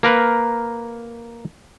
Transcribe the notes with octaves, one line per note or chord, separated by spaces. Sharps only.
A#3 A#4 B4